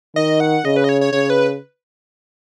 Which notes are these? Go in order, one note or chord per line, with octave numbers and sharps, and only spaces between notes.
D#3 D#5
F#5
C#3 D#5
B4
D#5
C#5
C#5
C#3 C#5
B4